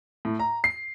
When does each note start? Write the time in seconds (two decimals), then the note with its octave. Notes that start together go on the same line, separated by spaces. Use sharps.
0.25 A2
0.39 A#5
0.64 C7